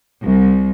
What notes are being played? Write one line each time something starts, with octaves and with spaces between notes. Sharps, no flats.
C2